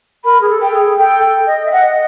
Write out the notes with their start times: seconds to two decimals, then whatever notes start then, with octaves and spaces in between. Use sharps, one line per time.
0.25 A#4 B5
0.41 G#4
0.49 A4
0.62 G5
0.74 G#4
0.98 A4 G5
1.47 D#5
1.65 E5
1.72 D#5 F#5